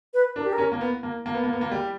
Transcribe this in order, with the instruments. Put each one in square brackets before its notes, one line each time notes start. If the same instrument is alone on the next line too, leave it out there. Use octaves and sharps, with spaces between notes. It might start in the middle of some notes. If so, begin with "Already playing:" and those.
[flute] B4
[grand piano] D4 [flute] A#4
[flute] G4
A#4
[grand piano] C#4
A#3
B3
A#3
A#3
B3
A#3
B3
A#3
G3